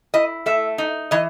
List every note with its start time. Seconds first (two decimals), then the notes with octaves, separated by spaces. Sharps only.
0.14 E4 D#5
0.46 A3 E5
0.78 D#4
1.11 E3 D#5